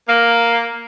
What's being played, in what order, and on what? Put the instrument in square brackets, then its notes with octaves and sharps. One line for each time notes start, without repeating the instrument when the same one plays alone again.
[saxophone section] A#3